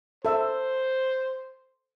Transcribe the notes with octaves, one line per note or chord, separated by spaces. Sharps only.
A4 C5 E5 E6